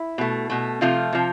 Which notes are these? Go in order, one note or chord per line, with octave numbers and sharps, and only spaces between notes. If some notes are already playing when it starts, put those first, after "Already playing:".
Already playing: E4
B2 A3
B2 A3
C3 F3 A3 F4
C3 F3